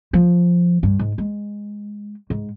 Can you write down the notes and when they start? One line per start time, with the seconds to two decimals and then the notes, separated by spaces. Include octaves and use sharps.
0.13 F3
0.83 G2
0.99 G#2
1.18 G#3
2.30 G#2